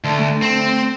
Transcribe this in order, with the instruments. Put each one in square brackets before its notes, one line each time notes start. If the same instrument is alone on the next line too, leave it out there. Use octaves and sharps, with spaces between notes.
[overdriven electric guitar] D2 [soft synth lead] A5
[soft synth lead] A3
[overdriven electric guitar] C4